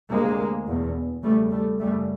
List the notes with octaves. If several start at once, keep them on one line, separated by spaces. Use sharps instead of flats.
D2 C3 G#3 A#3
E2 B2
E2 C#3 G3 A3
G3 A3
F#2 C#3 G3 A3